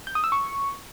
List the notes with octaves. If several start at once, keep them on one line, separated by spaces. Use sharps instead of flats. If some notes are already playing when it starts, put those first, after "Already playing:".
G6
D#6
E6
C#6